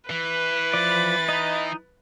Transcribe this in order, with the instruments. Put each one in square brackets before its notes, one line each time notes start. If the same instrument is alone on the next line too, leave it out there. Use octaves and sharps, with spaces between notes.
[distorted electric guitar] E3 [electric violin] B4
[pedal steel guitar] F3 D5 [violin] B5 A6
[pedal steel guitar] D#4 D#5